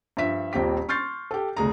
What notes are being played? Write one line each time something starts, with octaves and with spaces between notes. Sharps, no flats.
G2 F3 E5 B6
D#1 A#1 C4 G4 B6
C6 C#6 F6 G6 A6 C7
G4 A4
F1 D2 G#4 A#5